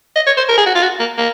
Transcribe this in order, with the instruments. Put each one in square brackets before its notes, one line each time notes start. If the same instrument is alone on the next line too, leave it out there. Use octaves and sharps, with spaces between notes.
[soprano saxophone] D#5
C#5
C5
A#4
G#4
F#4
F4
F#4
A#3
A#3